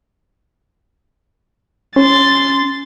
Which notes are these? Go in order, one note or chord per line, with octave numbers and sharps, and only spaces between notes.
C#4 C6 A6